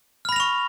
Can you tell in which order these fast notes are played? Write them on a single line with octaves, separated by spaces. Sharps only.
F6 B5 A#6 F7 C#6